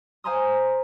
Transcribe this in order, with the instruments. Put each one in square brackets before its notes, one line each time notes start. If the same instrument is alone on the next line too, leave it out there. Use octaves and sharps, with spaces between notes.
[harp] C5 F5 G#5 A#5 C6 D#6